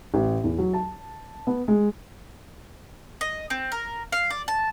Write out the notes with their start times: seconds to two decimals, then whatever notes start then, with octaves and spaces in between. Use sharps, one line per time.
0.14 A1
0.44 E2
0.58 F#3
0.74 A5
1.47 B3
1.68 G#3
3.21 D#5
3.50 C4
3.72 A#4
4.12 F5
4.30 D5
4.48 A5